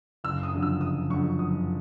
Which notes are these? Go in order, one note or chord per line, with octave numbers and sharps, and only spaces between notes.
F#1 E6
D#6
F2 D3 F#3
E6
F#1 D#6
F2 D3 F#3 C#6
F#1 D#6